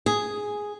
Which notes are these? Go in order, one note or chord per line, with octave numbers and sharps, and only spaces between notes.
G#4